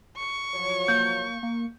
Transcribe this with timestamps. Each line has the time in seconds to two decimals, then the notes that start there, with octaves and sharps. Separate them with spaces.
0.18 C#6
0.55 F3 F#3 C#5
0.88 A#3 G6
1.43 A#3